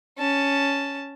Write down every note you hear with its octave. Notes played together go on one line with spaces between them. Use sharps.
C#4 A5